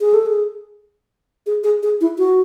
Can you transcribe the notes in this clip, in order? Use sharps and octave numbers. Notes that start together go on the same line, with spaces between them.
G#4
A4
G#4
G#4
G#4
G#4
E4
F#4